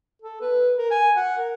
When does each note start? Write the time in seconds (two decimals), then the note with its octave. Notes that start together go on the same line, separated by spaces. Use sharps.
0.22 A4
0.41 B4
0.78 A#4
0.91 G#5
1.16 F#5
1.38 A#4